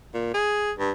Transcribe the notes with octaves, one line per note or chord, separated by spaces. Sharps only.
A#2
G#4
G2